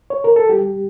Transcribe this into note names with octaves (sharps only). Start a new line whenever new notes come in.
C#5
A#4
A4
G3 G4